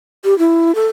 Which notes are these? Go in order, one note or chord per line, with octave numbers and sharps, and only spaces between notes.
G4
E4
A4